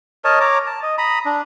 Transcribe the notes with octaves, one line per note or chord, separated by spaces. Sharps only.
A#4 C#5 D#5 A5
C#5 A#5 D6
A5
D#5
A#5 B5 D#6
D4